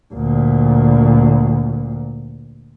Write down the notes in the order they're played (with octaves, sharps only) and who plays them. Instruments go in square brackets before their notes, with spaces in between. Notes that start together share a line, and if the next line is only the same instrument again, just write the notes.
[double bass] D2 A#2